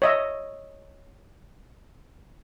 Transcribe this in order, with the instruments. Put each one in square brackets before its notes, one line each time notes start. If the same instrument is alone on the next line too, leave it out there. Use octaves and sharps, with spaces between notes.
[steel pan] C#5 D#5 E5